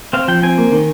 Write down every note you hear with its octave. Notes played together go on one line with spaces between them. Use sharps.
C4 F5
F3 G5
C4 G#5
A#3
D#3